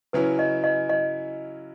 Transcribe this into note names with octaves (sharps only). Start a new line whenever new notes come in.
C#3 F#3 C#4 E4 B4
D#5
D#5
D#5